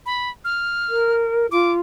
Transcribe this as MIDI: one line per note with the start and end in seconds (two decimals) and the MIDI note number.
0.06 0.30 83
0.45 1.14 89
0.89 1.46 70
1.51 1.80 65
1.51 1.72 86